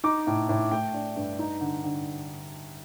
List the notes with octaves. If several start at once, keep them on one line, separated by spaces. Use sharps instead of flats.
D#4 D6
A2
A2
A3 G5
D4
G2
D#4
D3
D3